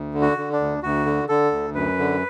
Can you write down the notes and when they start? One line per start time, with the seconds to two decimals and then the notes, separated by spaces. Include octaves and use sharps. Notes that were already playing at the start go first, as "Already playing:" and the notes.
Already playing: D2
0.14 D3
0.22 F#4
0.38 D3
0.52 D4
0.60 D2
0.83 D2 F#4
1.06 D3
1.29 D3 A4
1.52 D2
1.75 F#2 B4
1.98 D3